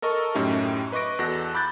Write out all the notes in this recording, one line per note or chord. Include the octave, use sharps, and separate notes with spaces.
A4 A#4 D#5 C#6
F#2 A2 C#4 D#4 G4 E5
B4 D#5 C#6 D6 A#6 D7
E2 F#4 A4 F#6 A#6
B5 D6 F#6 G6 A6